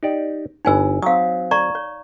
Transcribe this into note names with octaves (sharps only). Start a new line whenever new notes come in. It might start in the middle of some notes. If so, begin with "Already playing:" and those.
D#4 G4 D5
G1 D#4 B4 C#5 G#5 E6
F#3 C4 F5 D#6
D5 A#5 C#6
C#5